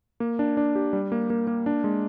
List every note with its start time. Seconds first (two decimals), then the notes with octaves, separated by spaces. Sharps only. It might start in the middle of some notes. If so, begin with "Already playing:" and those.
0.20 A#3
0.39 D4
0.57 D4
0.75 G4
0.93 G3
1.12 A#3
1.30 A#3
1.47 A#3
1.66 D4
1.84 G#3